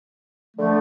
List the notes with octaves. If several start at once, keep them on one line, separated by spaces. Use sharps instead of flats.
D3 F3 A3